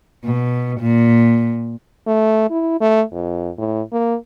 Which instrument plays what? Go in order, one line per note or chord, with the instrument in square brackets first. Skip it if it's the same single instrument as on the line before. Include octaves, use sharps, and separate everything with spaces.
[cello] B2
A#2
[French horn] A3
E4
A3
F2
A2
A#3